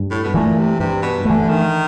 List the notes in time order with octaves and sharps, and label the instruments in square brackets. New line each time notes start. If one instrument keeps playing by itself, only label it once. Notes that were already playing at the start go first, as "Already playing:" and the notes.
Already playing: [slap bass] G2
[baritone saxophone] A2
B2
[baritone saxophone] A#2 [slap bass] E3 A3
[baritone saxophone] C3
[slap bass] G2 [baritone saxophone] C3
[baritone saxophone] B2
[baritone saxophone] D3 [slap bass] E3 A3
[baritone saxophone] D#3